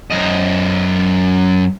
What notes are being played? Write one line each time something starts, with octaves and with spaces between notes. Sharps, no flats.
F#2 D#5